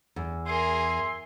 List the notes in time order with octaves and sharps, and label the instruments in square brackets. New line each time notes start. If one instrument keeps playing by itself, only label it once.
[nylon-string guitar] E2
[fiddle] G#4 A#4 [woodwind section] E5 G#5 C6